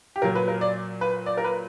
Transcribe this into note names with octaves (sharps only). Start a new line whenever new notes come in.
G4
A#2 F#3 A#4
B4
A#4
D5
B4
D5
A#4
B4